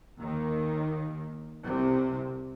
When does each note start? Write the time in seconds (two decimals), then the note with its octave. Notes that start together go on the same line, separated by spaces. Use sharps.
0.20 D#2 D#3
1.64 C2 C3